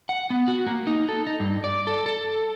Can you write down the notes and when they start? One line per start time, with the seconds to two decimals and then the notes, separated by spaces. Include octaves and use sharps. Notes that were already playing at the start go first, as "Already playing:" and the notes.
0.09 F#5
0.30 B3
0.48 F#4
0.66 A#3
0.87 D#4
1.09 A4
1.27 D#4
1.40 G2
1.64 D5
1.87 A4
2.06 A4